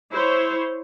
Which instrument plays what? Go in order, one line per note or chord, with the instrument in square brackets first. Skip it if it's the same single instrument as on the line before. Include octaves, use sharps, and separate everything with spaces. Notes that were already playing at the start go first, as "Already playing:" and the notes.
[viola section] E4 C5 C#5